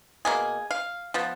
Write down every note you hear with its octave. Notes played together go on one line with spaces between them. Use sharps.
B2 A#3 G#4
F5
F3 B3